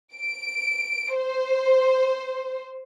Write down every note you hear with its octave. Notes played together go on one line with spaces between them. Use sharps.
D7
C5